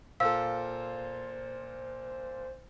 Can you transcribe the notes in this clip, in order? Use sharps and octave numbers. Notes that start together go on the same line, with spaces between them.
A#2 F4 A4 C5 F5 E6